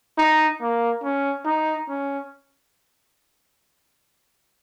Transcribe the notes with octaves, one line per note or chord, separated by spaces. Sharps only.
D#4
A#3
C#4
D#4
C#4